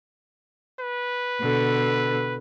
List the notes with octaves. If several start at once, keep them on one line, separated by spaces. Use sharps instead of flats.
B4
B2 D3